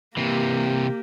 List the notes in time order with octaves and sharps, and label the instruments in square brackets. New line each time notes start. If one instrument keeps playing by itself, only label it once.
[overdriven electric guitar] C3 E3 [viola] A#3 G4